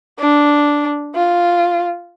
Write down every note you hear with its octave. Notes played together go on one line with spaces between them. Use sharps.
D4
F4